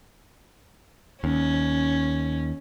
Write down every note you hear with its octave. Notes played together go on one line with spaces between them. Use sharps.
D#2 C#4